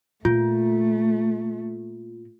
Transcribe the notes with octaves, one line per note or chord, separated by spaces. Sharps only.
A#2 A3 F4